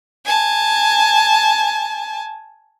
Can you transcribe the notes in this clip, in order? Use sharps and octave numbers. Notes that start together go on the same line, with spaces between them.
G#5 A5